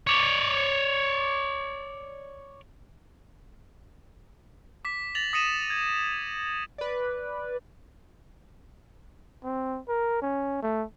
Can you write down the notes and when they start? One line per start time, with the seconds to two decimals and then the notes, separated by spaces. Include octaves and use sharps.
0.07 C#5 D5
4.85 D6 B6
5.15 A6 A#6 F7 F#7
5.33 D#6 A#6 B6 C#7 D#7 E7
5.70 G#6
6.78 B4 D5
9.44 C4
9.88 A#4
10.22 C#4
10.62 A3